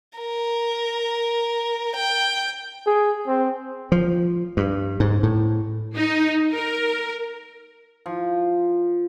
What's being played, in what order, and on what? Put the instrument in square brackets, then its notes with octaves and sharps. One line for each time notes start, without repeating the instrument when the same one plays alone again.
[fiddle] A#4
G5
[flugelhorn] G#4
C4
[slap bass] F3
G2
G#2
A2
[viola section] D#4
A#4
[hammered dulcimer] F3